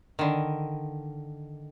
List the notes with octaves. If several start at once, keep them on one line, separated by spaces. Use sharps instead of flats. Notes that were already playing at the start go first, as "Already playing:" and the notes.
D3 D#3